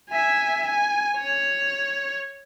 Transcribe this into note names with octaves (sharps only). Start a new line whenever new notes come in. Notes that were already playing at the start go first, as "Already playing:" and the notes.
E5 G#5
G#5
C#5